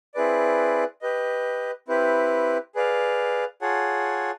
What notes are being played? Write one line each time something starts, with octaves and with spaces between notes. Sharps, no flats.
C4 E4 G#4 B4 D5
G4 B4 D#5
C4 E4 G4 B4
G#4 B4 D5 F5
F4 G#4 C#5 F#5 A5